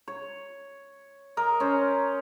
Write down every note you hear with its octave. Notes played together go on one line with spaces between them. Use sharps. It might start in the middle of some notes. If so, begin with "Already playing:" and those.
C#5
A#4 D#5
C#4 C5